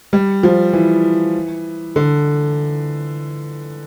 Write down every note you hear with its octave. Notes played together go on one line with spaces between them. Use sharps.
G3
F3
E3
D3